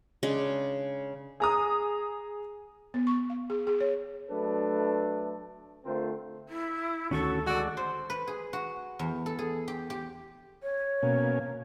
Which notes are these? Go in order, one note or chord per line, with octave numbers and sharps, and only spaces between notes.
C#3 G#3 D4
G#4 A#5 D#6
B3
C#6
F5
G#4
G#4
C#5
F#3 A3 D4 A4 B4
D3 A3 C4 F4 A#4 C5
E4
D2 D#3 C#4 F#4 A4 C#6
G#3 F#4 D5
C5
B4
G#4
F#4
E2
A4
G#4
G4
G4
C#5
B2 A#3 C#4